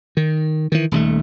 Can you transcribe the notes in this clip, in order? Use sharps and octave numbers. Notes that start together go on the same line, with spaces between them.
D#3
D#3 E3
D#1 D#2 A3